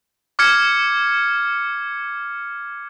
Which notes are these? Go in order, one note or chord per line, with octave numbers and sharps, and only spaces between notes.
D6 F6 G#6 C#7